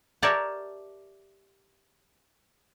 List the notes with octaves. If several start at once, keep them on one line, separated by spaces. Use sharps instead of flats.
G4 A#4 C#5 D5 E5 A5